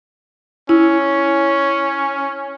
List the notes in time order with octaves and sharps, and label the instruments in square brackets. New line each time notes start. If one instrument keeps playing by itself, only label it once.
[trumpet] C#4 [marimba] E4